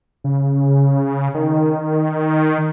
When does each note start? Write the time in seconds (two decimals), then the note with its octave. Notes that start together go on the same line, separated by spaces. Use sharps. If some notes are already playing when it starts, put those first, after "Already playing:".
0.24 C#3
1.34 D#3